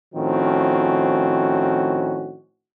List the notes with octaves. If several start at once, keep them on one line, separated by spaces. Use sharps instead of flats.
A2 D#3 F3 C4 C#4 F#4